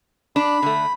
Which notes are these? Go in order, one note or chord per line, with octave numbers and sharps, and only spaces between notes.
D4 B5
D3 A3